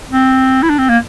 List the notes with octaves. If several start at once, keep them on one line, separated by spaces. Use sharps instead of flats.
C4
E4
D4
C4
A#3